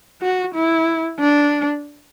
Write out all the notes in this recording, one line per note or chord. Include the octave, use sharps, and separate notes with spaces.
F#4
E4
D4